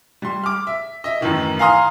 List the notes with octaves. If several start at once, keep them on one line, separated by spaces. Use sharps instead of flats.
G3 C6
D6 F6
E5
D#5 E5
F#2 A2 D#3 E3
F5 G#5 A#5 C6 D#6 F6